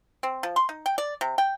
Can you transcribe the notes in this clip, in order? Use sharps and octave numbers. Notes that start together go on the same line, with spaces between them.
C4
F3
C6
D#4
G5
D5
C3
G5